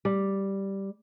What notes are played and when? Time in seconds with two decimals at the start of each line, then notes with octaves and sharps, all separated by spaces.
0.05 G3